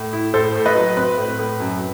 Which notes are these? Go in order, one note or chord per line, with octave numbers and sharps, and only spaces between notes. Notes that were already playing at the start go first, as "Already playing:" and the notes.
Already playing: A2
E4
A2 A4 C5
A2
B4 D#5
F#3
C4 B4
A2
A2
F#2